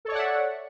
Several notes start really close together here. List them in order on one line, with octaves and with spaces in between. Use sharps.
A4 C#5 D5 F#5 E5